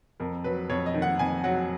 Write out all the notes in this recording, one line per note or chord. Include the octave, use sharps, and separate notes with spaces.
F2 A#4
F#3 B4
F2 C#5
D#5
D#3
F#5
F2 G#5
F#3 F#5